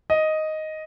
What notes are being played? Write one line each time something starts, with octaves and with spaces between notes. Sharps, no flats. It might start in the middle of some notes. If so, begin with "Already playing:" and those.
D#5